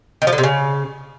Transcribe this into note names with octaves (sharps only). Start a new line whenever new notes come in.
D#3
F3
D3
C3
C#3